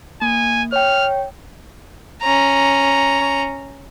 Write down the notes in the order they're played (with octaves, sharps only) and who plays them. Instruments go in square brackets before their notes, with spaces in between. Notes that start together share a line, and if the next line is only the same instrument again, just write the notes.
[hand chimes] A#3 [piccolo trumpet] G#5
[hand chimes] C#5 G5 [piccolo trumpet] F6
[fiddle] C#4 A#5